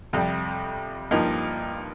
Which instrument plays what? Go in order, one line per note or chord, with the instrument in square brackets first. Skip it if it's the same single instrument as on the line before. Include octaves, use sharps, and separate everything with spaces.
[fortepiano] F2 C3 G3
G2 F3 A#3 D#4